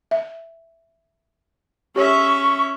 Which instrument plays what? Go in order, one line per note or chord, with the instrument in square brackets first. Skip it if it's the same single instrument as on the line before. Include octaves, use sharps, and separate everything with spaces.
[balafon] E5
[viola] C#4 E5 [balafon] G4 C#5 [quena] C#6